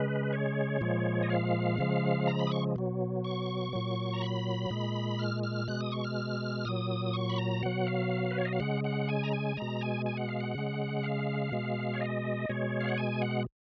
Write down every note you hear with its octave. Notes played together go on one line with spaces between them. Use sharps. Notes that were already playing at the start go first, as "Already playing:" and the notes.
Already playing: C#3 G#3 B4
C#5
A#2 F3 G#3
D#5
F5
C#3 F3 G#3
A#5
B5
D#6
C#6
B2 F#3
C#6
A#2 F#3
A#5
B5
A#2 G#3
F6
F6
B2 G#3 F#6
D#6
C#6
F6
A#2 F#3 D#6
C#6
B5
A#5
B2 F#3 F#5
F5
B4
C#5
D#5
F5
C#3 G#3 F#5
F#5
G#5
A#5
G#5
B2 G#3 A#5
G#5
G#5
F#5
F5
F#5
C#3 G#3
F5
B2 G#3
C#5
D#5
B2 G#3 C#5
F5
F#5
G#5
F#5